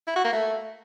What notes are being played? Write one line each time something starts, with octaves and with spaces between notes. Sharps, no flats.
E4
F#4
A#3
A3